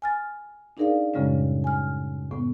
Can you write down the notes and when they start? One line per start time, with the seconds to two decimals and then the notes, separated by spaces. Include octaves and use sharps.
0.02 G#5 F6 A6
0.77 D4 D#4 G#4 A#4 D5 F5
1.14 F#2 A2 C#3 G3 G#3 C#4
1.64 G#5 F6
2.31 A2 B3